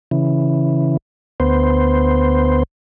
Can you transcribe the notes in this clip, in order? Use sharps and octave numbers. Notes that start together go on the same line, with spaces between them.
C#3 E3
D2 B3 C5